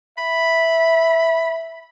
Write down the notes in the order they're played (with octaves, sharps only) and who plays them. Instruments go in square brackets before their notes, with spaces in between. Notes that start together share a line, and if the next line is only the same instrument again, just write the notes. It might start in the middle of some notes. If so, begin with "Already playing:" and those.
[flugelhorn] E5 [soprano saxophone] B5